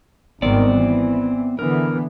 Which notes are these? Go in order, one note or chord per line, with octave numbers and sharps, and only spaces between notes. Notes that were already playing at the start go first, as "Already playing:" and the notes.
G#1 D#3 G3 B3 C4 D5
E3
D3 E3 B3 A#4